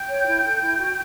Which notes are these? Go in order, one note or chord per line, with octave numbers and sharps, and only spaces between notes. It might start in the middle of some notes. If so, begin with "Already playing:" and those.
Already playing: G5 G6
C#5
E4
A4
E4
F#4